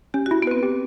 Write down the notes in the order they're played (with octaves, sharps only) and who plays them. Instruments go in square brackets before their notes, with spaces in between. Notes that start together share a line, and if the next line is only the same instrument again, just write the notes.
[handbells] C#4 [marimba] G4
[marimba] F#4
[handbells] E4
[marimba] B3
[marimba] C4 [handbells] B4
[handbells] G4